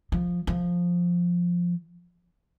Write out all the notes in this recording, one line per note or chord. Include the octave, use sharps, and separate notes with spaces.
F3
F3